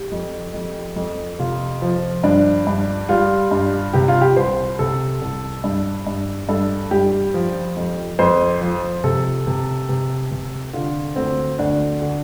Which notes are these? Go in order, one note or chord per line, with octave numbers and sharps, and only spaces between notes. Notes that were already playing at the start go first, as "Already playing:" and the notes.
Already playing: G4
F2
F2
F2
C3 F4
F3
G2 D4
G2
G3 F4
G2
C3 G4
F4
G4
C2 C5
C3 A4
C2
G2
G2
G2 A4
G2 G4
F3
F2
F2 C5
F3
C3 A4
C3
C3
C3
D3 F4
D2 C4
D2 D4
D3